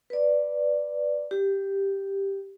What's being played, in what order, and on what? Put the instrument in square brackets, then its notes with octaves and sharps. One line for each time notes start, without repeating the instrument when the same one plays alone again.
[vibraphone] B4 D5
G4